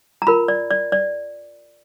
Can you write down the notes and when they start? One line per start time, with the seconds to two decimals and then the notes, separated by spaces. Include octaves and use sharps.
0.22 A#5
0.27 F4 A#4 B5
0.48 D5
0.71 D5
0.92 D5